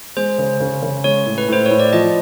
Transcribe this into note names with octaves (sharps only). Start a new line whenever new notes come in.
G#3 C5
C#3
C#3
C#3
G#3 C#5
A2
B4
A2 C5
C#5
A2
D5
F3 D#5